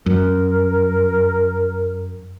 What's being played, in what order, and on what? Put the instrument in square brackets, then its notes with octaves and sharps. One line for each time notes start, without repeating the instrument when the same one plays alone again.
[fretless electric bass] F#2 [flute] A#4